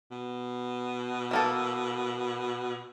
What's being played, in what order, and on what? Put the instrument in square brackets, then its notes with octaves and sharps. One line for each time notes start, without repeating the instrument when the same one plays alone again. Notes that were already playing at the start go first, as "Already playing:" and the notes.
[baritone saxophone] B2
[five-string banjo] E3 A#3 A4